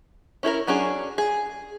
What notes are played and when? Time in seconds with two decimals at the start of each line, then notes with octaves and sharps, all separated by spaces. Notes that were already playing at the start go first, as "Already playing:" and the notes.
0.43 C#4 E4 A4 A#4
0.67 F#3 C#4 D4 G#4
1.18 G#4